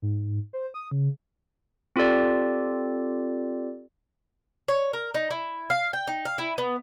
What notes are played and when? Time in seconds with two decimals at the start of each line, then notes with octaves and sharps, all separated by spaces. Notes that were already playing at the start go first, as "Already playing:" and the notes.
0.02 G#2
0.53 C5
0.74 D#6
0.91 C#3
1.96 C4 F4 G4 A4 D5
4.68 C#5
4.93 A#4
5.14 D#4
5.30 E4
5.70 F5
5.93 G5
6.07 D#4
6.25 F5
6.38 E4
6.58 B3